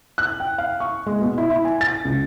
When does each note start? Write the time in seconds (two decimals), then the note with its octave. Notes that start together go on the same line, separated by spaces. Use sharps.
0.18 F#6
0.40 G5
0.58 F5
0.80 C#6
1.06 G#3
1.21 B2
1.38 E4
1.50 E4
1.65 G#5
1.81 A6
2.05 C#2